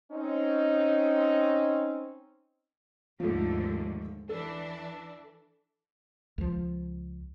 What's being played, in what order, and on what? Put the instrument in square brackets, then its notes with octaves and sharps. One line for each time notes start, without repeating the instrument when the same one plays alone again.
[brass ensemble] C4 C#4 D#4
[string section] D#2 G#2 D3 [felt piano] F3 A3
[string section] E3 D4 [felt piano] A4
[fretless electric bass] C#2 F3